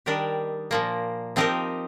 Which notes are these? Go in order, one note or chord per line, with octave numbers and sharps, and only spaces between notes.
D#3 G3 D4 G4 A#4
A#2 F3 A#3
F3 C4 D#4 G4 A#4